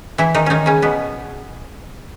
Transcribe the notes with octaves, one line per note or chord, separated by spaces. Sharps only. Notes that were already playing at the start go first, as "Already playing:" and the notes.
E3 E4
D#3 D#4
D#3 C#4 D#4
C#3 C#4
B2 B3